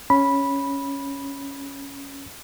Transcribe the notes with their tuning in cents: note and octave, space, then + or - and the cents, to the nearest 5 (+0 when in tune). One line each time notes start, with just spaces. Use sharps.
C#4 +0 B5 -10